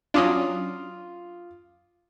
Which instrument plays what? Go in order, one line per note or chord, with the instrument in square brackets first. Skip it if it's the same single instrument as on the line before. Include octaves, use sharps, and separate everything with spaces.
[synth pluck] F#3 C#4 D4 [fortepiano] F4 D6 D#6